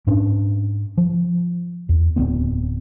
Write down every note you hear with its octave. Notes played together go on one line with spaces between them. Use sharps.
G#2 C#4 D4
F3
E2
D1 A2 B3 C4